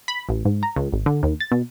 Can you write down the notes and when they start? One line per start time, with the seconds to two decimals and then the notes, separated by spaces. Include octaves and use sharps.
0.08 B5
0.29 A1
0.45 G#2
0.63 A#5
0.76 C#2
0.93 G#1
1.06 D3
1.23 D#2
1.40 A6
1.51 B2